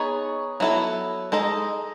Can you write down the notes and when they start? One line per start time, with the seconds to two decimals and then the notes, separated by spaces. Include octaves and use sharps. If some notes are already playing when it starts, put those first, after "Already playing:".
Already playing: B3 D#4 G#4 C#5
0.60 F#3 B3 E4 A4
1.32 G#3 D#4 A4 D#5